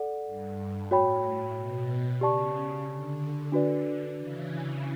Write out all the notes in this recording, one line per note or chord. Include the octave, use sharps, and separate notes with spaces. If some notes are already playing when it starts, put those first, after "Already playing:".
Already playing: A4 D5 F#5
G2
A2 F#4 C#5 G5 B5
B2
C#3 G4 D5 A5 C#6
D3
D4 F#4 B4 D5
C#3 E3